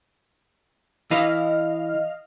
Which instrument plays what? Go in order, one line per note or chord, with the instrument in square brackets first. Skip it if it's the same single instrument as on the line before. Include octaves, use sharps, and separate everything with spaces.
[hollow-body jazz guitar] E3 [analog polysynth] D#5 F5 F6